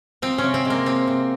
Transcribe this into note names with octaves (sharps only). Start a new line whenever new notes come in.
F3 C4
C#4
C3
C4
G#3
A#3
F3 C4
C3